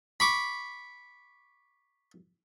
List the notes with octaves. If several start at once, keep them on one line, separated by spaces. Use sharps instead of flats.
B5 C#6 D6